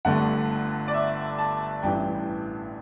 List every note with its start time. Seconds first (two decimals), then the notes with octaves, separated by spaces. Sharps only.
0.05 G1 G2 D3 A3 F#5
0.87 D5
0.94 E5
1.38 A5
1.82 A1 G2 E3 G5